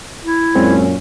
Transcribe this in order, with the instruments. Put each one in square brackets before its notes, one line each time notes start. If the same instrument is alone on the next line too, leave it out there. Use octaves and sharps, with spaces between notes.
[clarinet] E4
[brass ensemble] F#2 A#2 C#4 [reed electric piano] G#3 C4